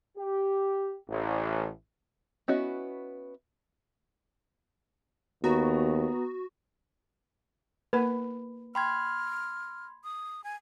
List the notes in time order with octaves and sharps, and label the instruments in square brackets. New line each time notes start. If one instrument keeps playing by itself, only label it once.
[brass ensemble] G4
A1
[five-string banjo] B3 C#4 E4 F#4 D#5
[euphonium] D#2 [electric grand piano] B3 A#5 [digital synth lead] F#4
[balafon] A#3 A#4 F#5 [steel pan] B4
[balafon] G5 [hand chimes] B5 C6 G#6 [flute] F6
[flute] D#6
G#5